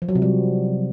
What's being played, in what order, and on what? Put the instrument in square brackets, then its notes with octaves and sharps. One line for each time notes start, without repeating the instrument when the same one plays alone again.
[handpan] F3
F#3
C3
G3